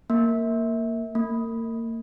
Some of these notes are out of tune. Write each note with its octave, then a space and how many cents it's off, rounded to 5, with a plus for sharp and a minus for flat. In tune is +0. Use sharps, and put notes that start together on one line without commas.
A#3 -10
A#3 -35